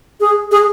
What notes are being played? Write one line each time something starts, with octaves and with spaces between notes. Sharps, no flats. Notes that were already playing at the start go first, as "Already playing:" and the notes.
G#4
G#4